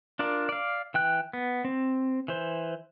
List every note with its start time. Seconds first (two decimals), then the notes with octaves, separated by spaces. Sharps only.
0.19 D4 F4 A#4 D5
0.49 D5 F5
0.94 E3 G5 F#6
1.33 B3
1.65 C4
2.28 E3 C5